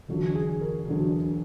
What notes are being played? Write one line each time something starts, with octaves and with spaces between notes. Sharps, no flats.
E1 D2 D3 F#3
G#4
A#4
E1 D2 D3 F#3